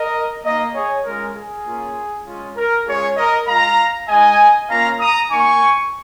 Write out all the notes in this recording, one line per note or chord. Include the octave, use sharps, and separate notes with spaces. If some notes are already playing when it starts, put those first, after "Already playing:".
Already playing: A#4 D#5
A#3 D#4 A#4 D#5
G#4 C#5
G#3 C#4 F4 A#4
G#4
A#3 C#4 F4
G#3 C#4 F4
A#4
G#3 C#4 F4 G#4 C#5
A#4 D#5
G#3 F4 F5 A#5
G#3 D#4 D#5 G#5
A#3 C#4 F4 F5 A#5
A#5 D#6
A#3 D#4 G#5 C#6